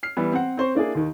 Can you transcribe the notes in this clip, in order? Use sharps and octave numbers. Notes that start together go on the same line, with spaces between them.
F6 C7
E3 G3 B3
C4 F#5
C4 C5 C#6
A#3 D4 E4 G#4
D#2 D#3